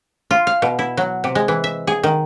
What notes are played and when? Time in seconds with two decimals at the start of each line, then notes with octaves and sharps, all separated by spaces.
0.31 F4
0.47 F5
0.62 B2
0.79 E4
0.97 F#3
1.24 C3
1.35 G#3
1.48 E3
1.64 E5
1.87 G#4
2.03 D#3